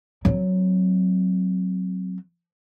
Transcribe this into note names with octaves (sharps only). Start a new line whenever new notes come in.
F#3 C4